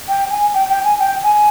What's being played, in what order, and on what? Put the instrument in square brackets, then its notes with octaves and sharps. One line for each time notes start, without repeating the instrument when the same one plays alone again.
[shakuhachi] G5
G#5
G5
G5
G#5
G5
G#5